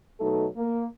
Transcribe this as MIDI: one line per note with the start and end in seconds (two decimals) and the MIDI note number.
0.20 0.46 47
0.20 0.46 54
0.20 0.46 57
0.20 0.46 63
0.20 0.46 69
0.57 0.84 58